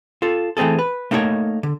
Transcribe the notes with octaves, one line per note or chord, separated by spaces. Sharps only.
F4 A4
E3 A3 C4 G#4 A4
B4
A3 A#3 D#4 E4 A#4 C#5
D3